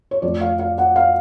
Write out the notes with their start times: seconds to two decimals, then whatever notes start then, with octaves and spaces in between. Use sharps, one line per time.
0.11 C#5
0.22 F2 F3 A3 D5
0.41 F5
0.59 F5
0.78 F#5
0.96 F5